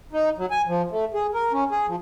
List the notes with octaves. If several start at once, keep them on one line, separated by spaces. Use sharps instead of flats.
D#4
F#3
G#5
F3
A3
G#4
A#4
C#4
G#4
F3